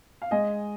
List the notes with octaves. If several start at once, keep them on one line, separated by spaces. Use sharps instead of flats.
F5
G#3 D#5 G#5